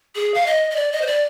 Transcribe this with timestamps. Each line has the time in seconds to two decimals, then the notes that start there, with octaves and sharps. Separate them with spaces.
0.15 G#4
0.34 F5
0.46 D#5
0.71 D#5
0.76 D5
0.92 D#5
1.02 C5
1.07 D5